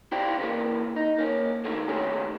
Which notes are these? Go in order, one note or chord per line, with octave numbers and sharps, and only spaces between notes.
E4 G4 C5 D5 F5 G5
C#3 E3 A#3
D#4
A#3 C#4
D3 D#3 A3 A#3
A2 D#3 A3 C#4 G4 G#4